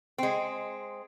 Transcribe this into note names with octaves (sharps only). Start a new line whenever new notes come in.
G#3 C4